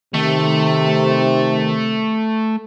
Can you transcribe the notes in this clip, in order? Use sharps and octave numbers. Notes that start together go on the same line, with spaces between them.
C3 D#3 A3